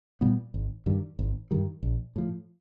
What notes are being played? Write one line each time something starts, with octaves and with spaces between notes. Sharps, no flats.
A#2 G3 B3
G#1
G2 D#3 G3
G#1
G2 D#3 G3
A#1
A2 F3